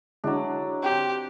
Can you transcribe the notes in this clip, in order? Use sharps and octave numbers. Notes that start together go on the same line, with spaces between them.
D3 F#3 G#3 D4 E4
C4 G4